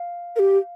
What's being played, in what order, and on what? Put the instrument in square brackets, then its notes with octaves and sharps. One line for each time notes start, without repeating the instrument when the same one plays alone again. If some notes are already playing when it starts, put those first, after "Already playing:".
Already playing: [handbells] F5
[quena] A#4
G4